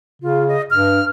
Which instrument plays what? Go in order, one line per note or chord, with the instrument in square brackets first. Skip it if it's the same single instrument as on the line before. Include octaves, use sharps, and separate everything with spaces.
[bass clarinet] C#3 [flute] F4
[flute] D#5
[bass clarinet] G2 [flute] F6